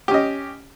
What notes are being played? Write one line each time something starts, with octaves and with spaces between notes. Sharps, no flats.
C#4 G4 D#5